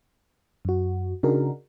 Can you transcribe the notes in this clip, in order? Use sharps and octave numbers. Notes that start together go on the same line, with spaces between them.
F#2 F#4
C#3 D4 D#4 F#4 G#4 A#4